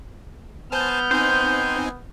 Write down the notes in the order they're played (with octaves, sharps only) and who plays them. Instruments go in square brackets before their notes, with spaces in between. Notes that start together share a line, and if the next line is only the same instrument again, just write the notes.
[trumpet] B3 [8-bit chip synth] C5 G#5 A5 [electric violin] F6 G6
[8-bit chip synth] C4 D#4 G#5 [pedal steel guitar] C5